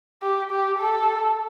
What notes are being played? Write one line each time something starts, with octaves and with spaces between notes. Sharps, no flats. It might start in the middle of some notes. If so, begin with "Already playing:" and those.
G4
G4
A4